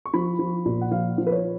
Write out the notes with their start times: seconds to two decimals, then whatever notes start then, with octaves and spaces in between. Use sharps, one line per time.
0.06 C#6
0.14 F3 B5
0.39 F3
0.66 A#2
0.81 F#5
0.91 F3 F5
1.18 F3
1.27 B4
1.31 C#5